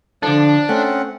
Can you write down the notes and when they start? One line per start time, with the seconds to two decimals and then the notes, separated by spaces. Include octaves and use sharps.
0.23 D3 F3 D4 A4
0.69 A3 C4 C#4 F#5